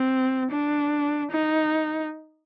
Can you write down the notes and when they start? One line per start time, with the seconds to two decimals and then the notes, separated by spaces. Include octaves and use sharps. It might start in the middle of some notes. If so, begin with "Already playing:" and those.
Already playing: C4
0.51 D4
1.31 D#4